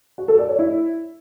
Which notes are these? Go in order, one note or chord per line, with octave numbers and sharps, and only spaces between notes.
F#4
A4
D5
C#5
E4